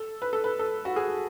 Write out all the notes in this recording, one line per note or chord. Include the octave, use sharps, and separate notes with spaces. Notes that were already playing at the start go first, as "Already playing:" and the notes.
Already playing: A4
B4
A4
B4
A4
F#4
G#4